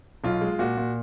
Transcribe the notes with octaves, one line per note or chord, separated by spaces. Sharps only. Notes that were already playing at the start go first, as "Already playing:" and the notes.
B1 F4
G#3
A#2 F#4
A#2